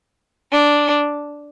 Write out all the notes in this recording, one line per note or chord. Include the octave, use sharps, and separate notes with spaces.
D4